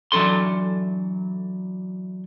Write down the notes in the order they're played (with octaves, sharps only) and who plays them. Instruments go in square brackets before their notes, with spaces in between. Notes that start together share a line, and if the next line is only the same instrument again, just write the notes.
[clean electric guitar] E3 F#3 D4 A4 C6